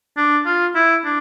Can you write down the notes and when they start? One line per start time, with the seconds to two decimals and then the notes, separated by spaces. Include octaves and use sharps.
0.17 D4
0.46 F4
0.75 E4
1.05 D4